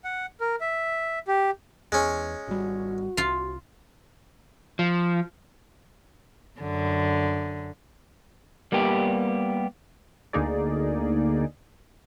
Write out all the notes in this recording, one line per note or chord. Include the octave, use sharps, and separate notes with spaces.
F#5
A#4
E5
G4
E2 G#3 C#4
G#1 G3 F#4
C2 F4 F5
F3
F#2 D3
G3 A#3 B3 G4
D2 D3 A#3 D#4 G#4 D5